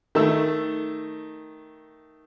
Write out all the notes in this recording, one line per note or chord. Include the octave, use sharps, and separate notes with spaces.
D#3 A3 A5 E6